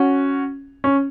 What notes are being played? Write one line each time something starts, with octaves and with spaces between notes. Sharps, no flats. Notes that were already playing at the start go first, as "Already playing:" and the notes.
Already playing: C#4 F#4
C#4